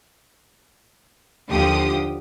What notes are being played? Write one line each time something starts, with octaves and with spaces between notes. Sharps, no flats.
D#2 D3 F3 G4 D#6